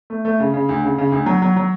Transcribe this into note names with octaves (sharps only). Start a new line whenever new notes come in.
A3
A3
C#3
C#3
D2
C#3
C#3
D2
F#3
F#3
F#3